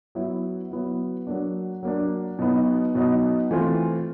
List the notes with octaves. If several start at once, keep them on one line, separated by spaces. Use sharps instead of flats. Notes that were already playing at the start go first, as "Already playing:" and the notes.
F#3 B3 E4
F#3 B3 E4
F#3 A#3 D4
F#3 A#3 D4
B2 F#3 B3 D#4
B2 F#3 B3 D#4
E3 A3 C4 F4